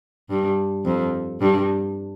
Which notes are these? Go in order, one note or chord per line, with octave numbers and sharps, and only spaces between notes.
G2
F2
G2